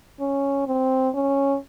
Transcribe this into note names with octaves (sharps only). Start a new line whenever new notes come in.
C#4
C4
C#4